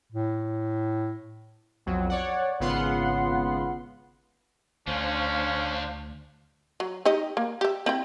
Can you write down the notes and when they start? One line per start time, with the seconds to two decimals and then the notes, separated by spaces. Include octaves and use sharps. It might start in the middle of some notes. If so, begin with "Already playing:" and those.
0.12 A2
1.86 B1 F2 F#3
2.10 C#5 D5 F#5
2.60 G#1 C#3 B3 F4 F#5 C6
4.88 D2 D3 A3 C#4 D4 C5 F5
6.80 F#3
7.05 D#4 G4 D#5
7.37 A#3
7.61 G4 E5
7.86 C4 E4 G5